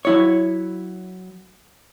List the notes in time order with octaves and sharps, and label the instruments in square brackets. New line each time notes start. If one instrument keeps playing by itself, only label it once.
[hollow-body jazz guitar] F#3 E4 C#5